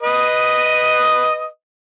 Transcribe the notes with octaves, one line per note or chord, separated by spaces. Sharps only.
B4 D#5 D#6